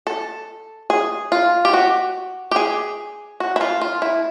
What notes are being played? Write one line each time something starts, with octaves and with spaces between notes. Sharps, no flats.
A4
G#4
F4
G4
F#4
G4
G#4
F#4
E4
F4
F4
E4